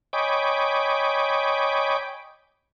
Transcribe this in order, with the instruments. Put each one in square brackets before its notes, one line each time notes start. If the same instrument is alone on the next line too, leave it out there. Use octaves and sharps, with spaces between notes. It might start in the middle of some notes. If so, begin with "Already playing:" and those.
[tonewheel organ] C#5 D#5 G5 G#5 B5 D6